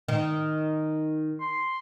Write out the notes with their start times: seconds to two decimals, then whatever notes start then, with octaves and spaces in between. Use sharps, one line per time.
0.08 D#3
1.41 C6